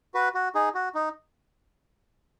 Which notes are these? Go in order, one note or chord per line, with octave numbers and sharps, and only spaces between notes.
F#4 B4
F#4
D#4 G#4
F#4
D#4